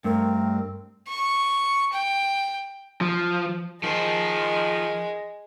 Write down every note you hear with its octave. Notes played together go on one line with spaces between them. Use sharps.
G2 A3 C4 A#4
C#6
G5
F3
D#3 F3 G#3 C5